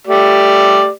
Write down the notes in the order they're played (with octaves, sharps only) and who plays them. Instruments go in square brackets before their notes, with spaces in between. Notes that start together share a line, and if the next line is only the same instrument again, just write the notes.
[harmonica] A3 G4 D5